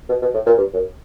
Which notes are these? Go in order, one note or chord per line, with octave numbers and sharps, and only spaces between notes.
B2
B2
A2
A#2
G2
F#2